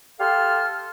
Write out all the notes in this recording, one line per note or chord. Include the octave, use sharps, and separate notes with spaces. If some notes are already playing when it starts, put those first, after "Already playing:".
G4 A4 F5 A5 C6 F6